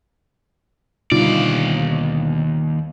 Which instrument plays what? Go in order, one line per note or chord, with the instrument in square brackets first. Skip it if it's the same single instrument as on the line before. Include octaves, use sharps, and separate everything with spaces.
[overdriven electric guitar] D#2 D5 [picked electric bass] B2 D3 [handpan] G3 D#4 F4